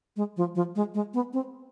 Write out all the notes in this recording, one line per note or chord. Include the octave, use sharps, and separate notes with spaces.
G#3
F3
F3
G#3
G#3
B3
C4